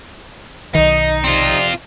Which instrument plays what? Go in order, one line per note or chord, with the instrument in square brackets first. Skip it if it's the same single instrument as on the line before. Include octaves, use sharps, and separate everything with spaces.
[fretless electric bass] B1 D#3 [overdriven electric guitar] D#4 [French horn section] D#5
[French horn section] C3 D5 [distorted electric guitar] C4 F4